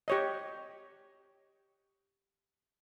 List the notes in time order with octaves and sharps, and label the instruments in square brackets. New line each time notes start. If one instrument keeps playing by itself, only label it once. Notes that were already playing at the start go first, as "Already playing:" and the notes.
[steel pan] G4 C#5 D#5